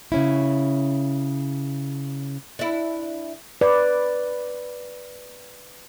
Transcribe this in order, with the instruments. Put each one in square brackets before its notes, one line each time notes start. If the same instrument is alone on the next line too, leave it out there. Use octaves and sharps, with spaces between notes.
[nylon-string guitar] C#3 C#4 E4
[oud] D4 E4
[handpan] B4 D5